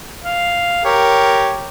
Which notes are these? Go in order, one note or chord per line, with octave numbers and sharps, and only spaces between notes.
F5
G4 A#4 C#5